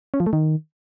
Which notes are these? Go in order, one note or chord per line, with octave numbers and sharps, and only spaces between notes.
C#4
F3
A3
D#3